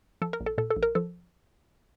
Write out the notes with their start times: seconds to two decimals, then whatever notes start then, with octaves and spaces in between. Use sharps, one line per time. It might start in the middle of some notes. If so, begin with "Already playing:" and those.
0.22 F3 A4
0.33 A#4
0.40 A#1
0.46 A4
0.58 A#2 A4
0.71 A4
0.76 A#1
0.83 A#4
0.95 F3 A4